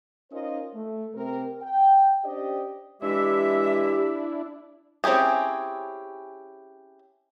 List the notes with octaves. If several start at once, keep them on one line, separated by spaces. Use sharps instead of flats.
C#4 D#4 F4 A#4 C5 D#5
A3
C3 C4 A#4
G5
C#4 D4 G4 C5 D5 D#5
E3 G#3 D4 E4 G4 E5
C4 C#4 E4 G4 G#4